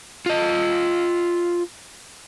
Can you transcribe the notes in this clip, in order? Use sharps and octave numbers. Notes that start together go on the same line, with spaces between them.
F4 D#5